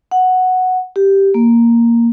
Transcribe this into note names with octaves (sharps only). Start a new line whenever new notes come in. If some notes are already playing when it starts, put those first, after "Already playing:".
F#5
G4
A#3